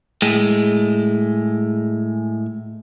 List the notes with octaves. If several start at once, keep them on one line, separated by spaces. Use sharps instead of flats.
A2 G#3